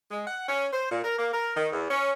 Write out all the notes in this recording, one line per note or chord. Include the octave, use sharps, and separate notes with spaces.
G#3
F#5
C#4
C5
A#2
A#4
A#3
A#4
D#3
E2
C#4